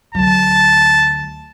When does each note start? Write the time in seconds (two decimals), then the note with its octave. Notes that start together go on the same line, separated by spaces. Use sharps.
0.15 D2 F#3 A5